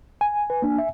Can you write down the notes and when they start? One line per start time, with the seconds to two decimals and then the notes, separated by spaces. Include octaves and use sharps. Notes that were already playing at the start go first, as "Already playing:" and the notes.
0.21 G#5
0.50 B4
0.62 A#3 D4
0.78 E5